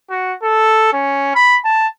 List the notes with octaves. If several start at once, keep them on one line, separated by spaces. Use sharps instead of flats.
F#4
A4
C#4
B5
A5